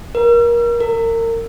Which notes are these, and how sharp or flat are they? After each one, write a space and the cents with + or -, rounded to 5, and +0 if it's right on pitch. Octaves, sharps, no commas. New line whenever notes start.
A#4 +25
A#4 -30